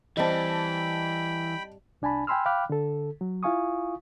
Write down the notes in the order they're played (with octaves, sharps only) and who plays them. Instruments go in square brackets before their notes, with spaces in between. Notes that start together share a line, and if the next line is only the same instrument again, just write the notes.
[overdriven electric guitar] E3 [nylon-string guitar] G3 C4 [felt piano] D#5 A5 [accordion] G5 B5
[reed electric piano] C2 D4 G#5 A5 B5
G5 G#5 B5 C6 E6 F6
F5 G5 B5 D6 F6 F#6
D3 A4
F#3
E4 F4 F5 G#5 C#6 D#6